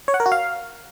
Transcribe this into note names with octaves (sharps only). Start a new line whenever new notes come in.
C#5
F#5
A#4
F#4
F5